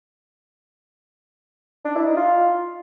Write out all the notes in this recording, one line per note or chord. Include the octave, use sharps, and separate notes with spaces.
D4
E4
D#4
F4